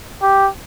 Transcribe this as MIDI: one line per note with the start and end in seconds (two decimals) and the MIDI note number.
0.22 0.48 67